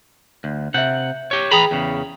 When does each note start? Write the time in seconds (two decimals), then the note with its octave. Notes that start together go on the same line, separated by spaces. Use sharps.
0.44 D2
0.74 C3 E5 F#5 G6
1.31 G4 C#5
1.51 E3 G#4 G5 A#5 B5 D#6
1.71 E2 C#3